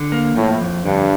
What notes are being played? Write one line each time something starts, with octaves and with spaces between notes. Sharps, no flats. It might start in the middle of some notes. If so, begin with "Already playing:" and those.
Already playing: D3
A#3
A2 F3
F2
G2 D3